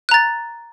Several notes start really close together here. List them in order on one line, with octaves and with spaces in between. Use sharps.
F#6 A#5 A6